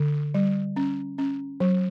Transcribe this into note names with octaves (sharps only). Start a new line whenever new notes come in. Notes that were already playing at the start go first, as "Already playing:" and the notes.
Already playing: D3
G3
C#4
C#4
F#3